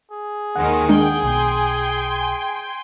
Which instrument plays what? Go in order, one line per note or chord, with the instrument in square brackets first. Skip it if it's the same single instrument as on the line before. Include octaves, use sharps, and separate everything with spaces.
[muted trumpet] G#4
[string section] D#2 D#3 G#3 [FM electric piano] F#5
[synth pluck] G#3 D4 [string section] G5
[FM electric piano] B1 B2 [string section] G5 G#5 C6